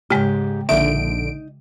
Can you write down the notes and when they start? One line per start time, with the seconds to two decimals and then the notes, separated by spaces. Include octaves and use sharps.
0.10 G#2 C#3 G#3 G4
0.69 A#1 D3 D#4 E5 D7